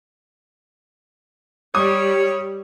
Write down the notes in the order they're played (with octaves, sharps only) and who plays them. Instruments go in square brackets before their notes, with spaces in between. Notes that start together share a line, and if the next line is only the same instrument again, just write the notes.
[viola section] G3 [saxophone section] C#5 [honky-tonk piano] D#6